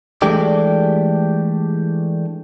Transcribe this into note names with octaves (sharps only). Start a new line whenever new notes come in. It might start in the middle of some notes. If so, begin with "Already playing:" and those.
E3 G#3 A3 D4 G4 D5